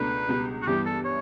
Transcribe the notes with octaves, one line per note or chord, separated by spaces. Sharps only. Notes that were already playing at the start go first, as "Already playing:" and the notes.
Already playing: C#2 B2 A3 D4 B4
C#2 B2 G3
F#4
G2 E3 G3 B3 G4
A4
C#5